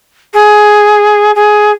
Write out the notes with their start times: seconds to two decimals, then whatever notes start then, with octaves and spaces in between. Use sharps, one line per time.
0.33 G#4
1.35 G#4